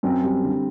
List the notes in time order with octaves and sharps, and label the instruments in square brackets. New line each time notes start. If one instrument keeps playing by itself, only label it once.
[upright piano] F#2 [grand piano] C4
[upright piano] G3
D3